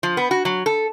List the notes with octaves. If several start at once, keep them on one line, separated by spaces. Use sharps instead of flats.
F3
B3
F#4
F#3
A4